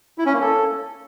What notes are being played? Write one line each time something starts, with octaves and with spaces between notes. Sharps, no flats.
E4
C#4
A#3
A4